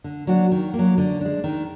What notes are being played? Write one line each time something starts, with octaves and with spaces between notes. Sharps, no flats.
D3
F#3 A#3 D4 F#4
D#3
A#3
F#3
D3
G#3 D4
D#3